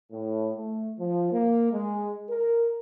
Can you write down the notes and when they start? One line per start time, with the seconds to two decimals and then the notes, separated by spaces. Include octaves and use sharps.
0.11 A2
0.57 A3
0.98 F3
1.32 A#3
1.72 G#3
2.29 A#4